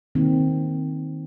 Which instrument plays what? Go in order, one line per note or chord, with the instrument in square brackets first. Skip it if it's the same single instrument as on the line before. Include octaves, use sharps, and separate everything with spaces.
[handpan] D#3 A#3 C4